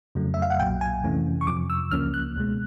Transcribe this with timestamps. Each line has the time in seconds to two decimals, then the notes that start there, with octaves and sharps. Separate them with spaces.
0.15 F2 C#3 F#3 A3
0.34 E5
0.42 F5
0.50 F#5
0.59 B1 A#2 F#3 G5
0.81 G#5
1.04 F2 C3 E3 A3 C#4
1.41 C#6
1.47 F2 C3 F3 D6
1.70 E6
1.91 C#2 C#3 F3 A#3 C#4 F6
2.14 F#6
2.36 C#2 B2 G#3